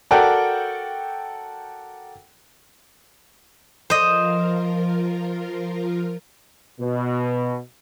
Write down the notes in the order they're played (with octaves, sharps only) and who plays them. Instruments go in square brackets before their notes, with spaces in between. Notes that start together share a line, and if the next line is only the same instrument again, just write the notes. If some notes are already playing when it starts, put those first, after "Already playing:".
[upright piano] F#4 A4 A#4 D5 F#5 G5
[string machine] F3 F4 A#4 [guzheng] C5 D#5
[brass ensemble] B2